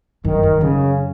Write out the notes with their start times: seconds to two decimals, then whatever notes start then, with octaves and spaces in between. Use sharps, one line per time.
0.25 F#2 D#3
0.43 F#2
0.61 F#2 C#3